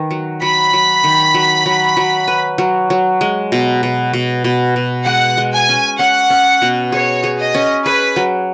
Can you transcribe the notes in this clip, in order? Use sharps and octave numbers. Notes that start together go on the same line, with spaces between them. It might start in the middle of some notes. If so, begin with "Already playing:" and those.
Already playing: D#3 B4
F#3
F#3 B5
F#3
D#3
F#3
F#3
F#3
B4
F#3
F#3
G#3
B2
B2
B2
B2
B2
G#3 F#5
G#3
G#5
C#4
C#4 F#5
C#4
B2
G#4 C#5
G#4
D#5
C#4
G#4 B4
F#3